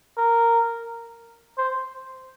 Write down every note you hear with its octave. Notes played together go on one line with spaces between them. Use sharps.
A#4
C5